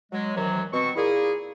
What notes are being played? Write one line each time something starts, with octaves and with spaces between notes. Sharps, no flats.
F#3 G#3
D#2 C3 D#3 E3 F#3
B2 C4 C#6
A#2 A#3 E4 G#4